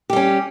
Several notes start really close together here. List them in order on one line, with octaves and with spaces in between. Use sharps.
G4 G3 C#4